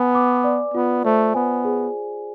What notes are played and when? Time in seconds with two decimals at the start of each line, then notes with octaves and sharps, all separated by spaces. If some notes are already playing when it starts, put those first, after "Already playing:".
Already playing: B3 B4 G#5
0.15 D6
0.44 D5
0.74 B3 F4
1.04 A3 C5
1.34 B3 G#5
1.65 G#4